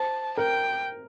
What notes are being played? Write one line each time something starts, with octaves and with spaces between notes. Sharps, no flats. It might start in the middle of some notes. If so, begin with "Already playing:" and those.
Already playing: C5 A5
A#4 G5